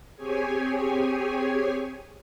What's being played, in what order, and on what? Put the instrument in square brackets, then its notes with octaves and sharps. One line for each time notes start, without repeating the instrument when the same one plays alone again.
[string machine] C4 G4 G#4 C#5 G#5